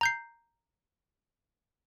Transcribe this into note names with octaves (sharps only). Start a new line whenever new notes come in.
A#5 G6 C7